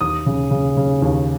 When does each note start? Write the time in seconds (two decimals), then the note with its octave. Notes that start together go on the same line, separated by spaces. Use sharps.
0.01 D#2 D#6
0.26 C#3
0.51 C#3
0.77 C#3
1.02 D#2